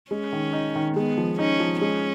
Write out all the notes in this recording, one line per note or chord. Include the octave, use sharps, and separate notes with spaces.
G#3 C#4
D#3
D#4
D#3
G#3 B3
F3
C#4 D#4
F3
G#3 C#4